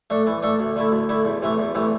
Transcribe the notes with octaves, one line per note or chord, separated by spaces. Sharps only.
A3 D4 A4
E3
A3 D4 A4
D2
D3 A3 E4
D2
D3 A3 E4
E2
C3 E3 A3
E2
C3 E3 A3